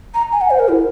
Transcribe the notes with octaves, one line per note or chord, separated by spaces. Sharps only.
A#5
G#5
F#5
C5
A#4
E4